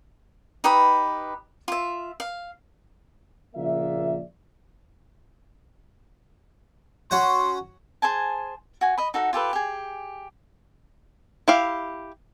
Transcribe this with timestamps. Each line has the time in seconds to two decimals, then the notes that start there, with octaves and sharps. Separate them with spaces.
0.64 D#4 G4 B4 B5
1.68 F4 E5
2.20 F5
3.56 A#1 C#3 F3 A#3 D5 E5
7.11 C#4 F#4 F#5 C6
8.02 G#4 C5 G#5 A5
8.81 F#4 G#5
8.98 D#5 B5
9.14 D#4 F#4 A4 F#5
9.33 F4 G4 A4 B4
9.53 G4 G#4
11.48 E4 G4 F5